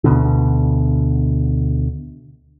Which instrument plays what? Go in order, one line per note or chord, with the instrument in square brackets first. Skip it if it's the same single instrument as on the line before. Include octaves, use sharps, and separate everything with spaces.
[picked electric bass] D2 B2 D3